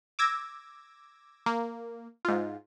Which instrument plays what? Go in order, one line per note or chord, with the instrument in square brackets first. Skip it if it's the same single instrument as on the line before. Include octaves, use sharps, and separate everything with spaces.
[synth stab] D6 E6 G#6 A#6
A#3
G#2 F4